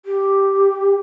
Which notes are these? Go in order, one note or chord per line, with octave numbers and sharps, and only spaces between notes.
G4